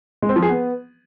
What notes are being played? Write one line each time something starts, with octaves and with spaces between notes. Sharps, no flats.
G#3
C4
F3
G#4
B3